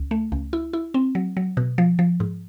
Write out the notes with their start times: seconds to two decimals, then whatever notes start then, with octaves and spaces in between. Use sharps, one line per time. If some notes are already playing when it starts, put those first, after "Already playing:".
Already playing: C#2
0.11 A3
0.32 C#2
0.53 E4
0.73 E4
0.94 C4
1.15 F#3
1.37 F#3
1.57 B2
1.78 F3
1.99 F3
2.20 G#2